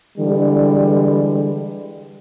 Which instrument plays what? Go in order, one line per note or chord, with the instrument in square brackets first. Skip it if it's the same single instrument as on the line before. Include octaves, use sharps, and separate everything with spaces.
[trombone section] D3 E3 G3 G#3